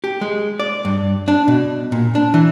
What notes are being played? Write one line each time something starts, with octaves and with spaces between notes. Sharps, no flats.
G4
G#3
D5
G2
D4
B2
A#2
D4
E3